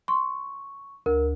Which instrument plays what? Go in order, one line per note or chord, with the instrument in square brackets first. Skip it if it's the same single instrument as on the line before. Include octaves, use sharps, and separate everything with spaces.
[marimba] C6 [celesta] C#6
[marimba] D2 [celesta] A#4